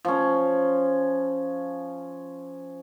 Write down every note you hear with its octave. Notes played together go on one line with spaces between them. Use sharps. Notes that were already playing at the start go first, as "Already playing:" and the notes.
F3 C#4